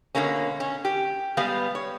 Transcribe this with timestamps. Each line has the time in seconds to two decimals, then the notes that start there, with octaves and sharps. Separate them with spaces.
0.15 B2 D3 G#3 A#3 C#4
0.60 C#4
0.85 G4
1.37 G3 G#3 B3 B4 F5
1.75 C#5